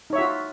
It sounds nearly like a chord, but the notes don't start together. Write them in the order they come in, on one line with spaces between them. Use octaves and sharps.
D#4 C#5 E5 F#4 F4